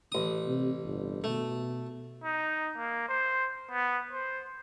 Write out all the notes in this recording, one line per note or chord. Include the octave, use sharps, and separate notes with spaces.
A1 D#6
C3
G1
B2 A3
D#4
A#3
C5
B3
C5